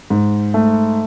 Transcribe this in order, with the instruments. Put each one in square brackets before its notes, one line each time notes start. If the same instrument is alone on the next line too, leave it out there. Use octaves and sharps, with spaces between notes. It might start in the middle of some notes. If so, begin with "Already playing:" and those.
[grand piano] G#2
A3